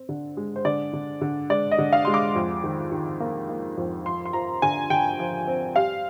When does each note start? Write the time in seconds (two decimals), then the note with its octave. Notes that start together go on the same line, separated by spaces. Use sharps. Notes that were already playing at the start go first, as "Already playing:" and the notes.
Already playing: C4
0.09 D3
0.37 G#3
0.56 C5
0.65 D3 D5
0.93 D3
1.21 D3
1.50 G#3 D5
1.71 D#5
1.78 D3
1.93 F5
2.05 G#3 C6
2.14 D6
2.35 F2
2.64 D#3
2.92 D#3
3.20 A#3
3.49 A#3
3.77 F2
4.06 F3 C6
4.25 C6
4.33 F3 A#5
4.62 D3 G#5
4.90 D3 G5
5.19 F3
5.47 C4
5.76 G3 F5